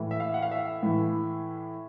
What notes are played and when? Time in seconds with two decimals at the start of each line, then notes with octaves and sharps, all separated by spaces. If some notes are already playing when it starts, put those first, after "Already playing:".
Already playing: A2 E3
0.11 E5
0.20 F5
0.34 F#5
0.42 F5
0.51 E5
0.83 A2 E3